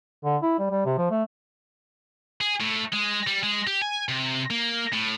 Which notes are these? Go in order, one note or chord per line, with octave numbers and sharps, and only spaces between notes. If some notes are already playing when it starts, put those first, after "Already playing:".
D3
E4
G3
G3
C3
F3
A3
G#4
A2
G#3
G3
G#3
G4
G#5
C3
A#3
A2